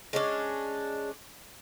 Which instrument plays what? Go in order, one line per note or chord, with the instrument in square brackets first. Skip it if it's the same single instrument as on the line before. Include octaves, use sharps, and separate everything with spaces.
[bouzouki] G#3 C#4 D4